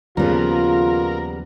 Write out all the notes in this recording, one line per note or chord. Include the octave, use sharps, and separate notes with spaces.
D#2 C#3 F3 G3 B3 F4 G#4 A#4